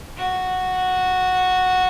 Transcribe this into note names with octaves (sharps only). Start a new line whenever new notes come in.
F#4